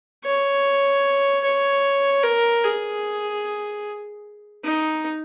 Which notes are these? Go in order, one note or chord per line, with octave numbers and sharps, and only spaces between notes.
C#5
C#5
A#4
G#4
D#4